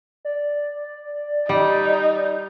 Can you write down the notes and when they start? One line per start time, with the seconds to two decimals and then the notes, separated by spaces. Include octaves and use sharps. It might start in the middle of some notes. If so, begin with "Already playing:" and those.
0.25 D5
1.49 G3 D#4